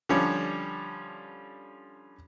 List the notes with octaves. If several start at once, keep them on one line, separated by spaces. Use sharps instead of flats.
D3 F3 G3 C#4